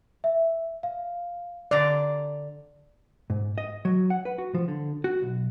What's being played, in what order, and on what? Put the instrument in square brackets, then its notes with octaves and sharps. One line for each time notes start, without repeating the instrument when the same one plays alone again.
[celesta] E5
F5
[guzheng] D3 A#5 C6 [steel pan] D5
[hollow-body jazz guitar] G#2
D#5
F#3
F#5
B4
F#4
F3
D3
F#4
B1